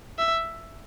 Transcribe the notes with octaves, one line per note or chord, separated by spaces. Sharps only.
E5